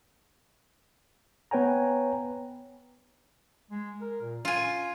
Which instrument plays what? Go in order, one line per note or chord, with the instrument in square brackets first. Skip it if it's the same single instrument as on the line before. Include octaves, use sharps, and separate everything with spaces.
[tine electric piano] B3 B4 C#5 G5 G#5 A#5
[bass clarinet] G#3
A#4
A#2
[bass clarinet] C#4 [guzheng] F4 G#5